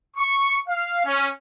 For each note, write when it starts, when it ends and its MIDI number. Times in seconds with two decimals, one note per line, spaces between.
0.17 0.56 85
0.68 1.05 77
1.05 1.26 61